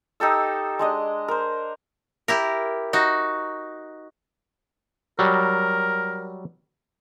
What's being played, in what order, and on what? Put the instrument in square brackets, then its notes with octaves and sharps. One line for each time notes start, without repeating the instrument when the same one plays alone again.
[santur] D#4 G4 A4 E6
G#3 D4 D#5
A#4 C5
[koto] E4 G4 A#4
D#4 F#4
[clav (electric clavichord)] F#3 G3 [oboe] A#4